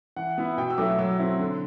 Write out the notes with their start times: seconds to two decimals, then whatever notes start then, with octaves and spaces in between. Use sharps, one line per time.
0.16 E3 F#5
0.38 B3 E4
0.58 B2 G5
0.70 E6
0.78 F#3 A3 E4 D6
0.99 F#3 E6
1.19 C4 E4
1.39 D3